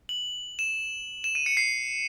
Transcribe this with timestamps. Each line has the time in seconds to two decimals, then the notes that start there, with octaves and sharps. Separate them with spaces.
0.09 F#7
0.59 E7
1.24 E7
1.35 D#7
1.46 C#7
1.57 C7